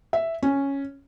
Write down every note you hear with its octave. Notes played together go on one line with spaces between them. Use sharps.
E5
C#4